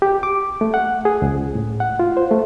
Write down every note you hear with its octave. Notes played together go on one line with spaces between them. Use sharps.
G4
D6
A3
F#5
G#4
C#2
A2
F#5
F4
C5
A3